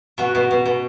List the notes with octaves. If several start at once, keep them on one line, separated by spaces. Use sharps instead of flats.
B2 F#4
B2
B2
B2